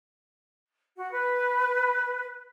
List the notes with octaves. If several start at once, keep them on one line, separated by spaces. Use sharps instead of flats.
F#4
B4